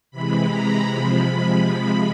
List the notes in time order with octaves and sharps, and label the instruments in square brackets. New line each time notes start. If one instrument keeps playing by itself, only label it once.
[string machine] C3 E3 G#3 B5
A#5
C3 F3 G#3 B5